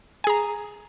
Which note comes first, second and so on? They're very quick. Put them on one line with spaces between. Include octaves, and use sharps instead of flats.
G#5 G#4 A#5